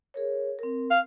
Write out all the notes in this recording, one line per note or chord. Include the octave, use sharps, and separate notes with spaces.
G#4 A#4 C#5
C4 A#4
F5